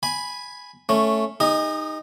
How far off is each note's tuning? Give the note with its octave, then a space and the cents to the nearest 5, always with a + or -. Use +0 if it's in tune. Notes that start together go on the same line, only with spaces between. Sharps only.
G#5 +0 B5 +0
A3 +0 C#4 +0
D#4 +0 G#4 -45 D#5 -5